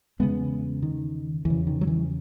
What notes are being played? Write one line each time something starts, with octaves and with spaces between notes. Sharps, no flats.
E2 C#3 G#3 B3
D#3
E2 E3
C#3
D#3
F#3
E3